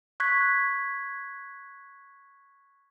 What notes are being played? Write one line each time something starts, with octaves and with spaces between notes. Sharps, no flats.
C#6 F#6 G#6 B6